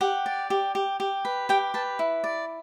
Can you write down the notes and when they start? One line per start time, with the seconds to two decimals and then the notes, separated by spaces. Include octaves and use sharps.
0.01 G4 F#5
0.26 D5
0.50 G4
0.75 G4
1.00 G4
1.25 B4
1.49 G4 G5
1.74 B4 A5
1.99 E4
2.24 D5